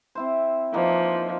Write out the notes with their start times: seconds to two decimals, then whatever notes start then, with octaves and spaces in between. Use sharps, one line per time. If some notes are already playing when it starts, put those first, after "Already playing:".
0.15 C4 E4 C5
0.74 E3 F3 A#3 D#4